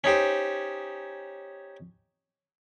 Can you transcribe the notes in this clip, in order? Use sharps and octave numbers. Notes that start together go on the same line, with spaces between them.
C#4 D#4 G4 C5